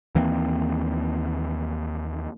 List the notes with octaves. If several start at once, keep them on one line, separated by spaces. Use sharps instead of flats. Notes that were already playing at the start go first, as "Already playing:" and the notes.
D#2 E3 A#3 C4